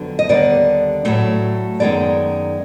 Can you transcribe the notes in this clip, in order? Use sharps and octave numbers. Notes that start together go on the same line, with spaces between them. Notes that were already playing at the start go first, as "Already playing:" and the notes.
Already playing: F2 D3 F#3 B3
D#5
D#2 D3 G3 B3 D5
A2 F#3 A3
F#2 D#3 G#3 B3 D5